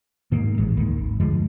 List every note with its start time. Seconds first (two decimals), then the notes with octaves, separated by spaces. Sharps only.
0.32 G#2 D#3 A#3
0.58 A1 G#2
0.77 G#1 D2 D#3 A#3
0.98 G#1
1.20 G2 D3 F3 G#3